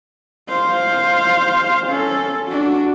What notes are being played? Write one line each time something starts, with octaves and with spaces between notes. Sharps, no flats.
C5 F5
C#4 A4
D4 F#4